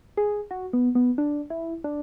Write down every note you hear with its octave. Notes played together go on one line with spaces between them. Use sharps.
G#4
F#4
B3
B3
D4
E4
D4